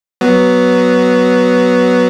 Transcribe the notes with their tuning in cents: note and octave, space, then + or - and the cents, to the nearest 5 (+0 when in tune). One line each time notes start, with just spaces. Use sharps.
F#3 +10 B3 +0